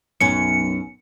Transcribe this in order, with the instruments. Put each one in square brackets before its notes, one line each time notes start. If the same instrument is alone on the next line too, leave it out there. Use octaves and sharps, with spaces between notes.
[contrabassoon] B1 [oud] F#2 C#4 [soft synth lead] C#7